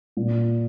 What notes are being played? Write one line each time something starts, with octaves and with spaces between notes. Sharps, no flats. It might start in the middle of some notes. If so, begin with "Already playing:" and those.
A#2